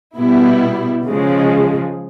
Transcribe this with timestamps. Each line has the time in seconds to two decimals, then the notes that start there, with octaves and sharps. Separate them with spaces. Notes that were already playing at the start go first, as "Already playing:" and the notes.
0.17 B2 G3 B3 E4
1.06 C#3 F3 G#3